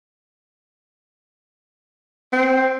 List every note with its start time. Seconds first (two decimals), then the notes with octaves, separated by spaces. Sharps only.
2.33 C4